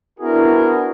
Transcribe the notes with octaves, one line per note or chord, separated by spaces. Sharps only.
B3 D4 E4 F#4 G#4 A#4